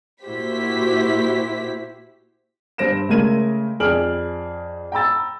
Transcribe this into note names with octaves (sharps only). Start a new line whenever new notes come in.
A#2 E4 F#4 G4 C5 B6
G2 C5 A#6 D7 E7
C#3 G#3 A3 A#4 G#6 D#7
F2 G#4 D5 F6 D7 F#7
G5 A#5 B5 E6 A6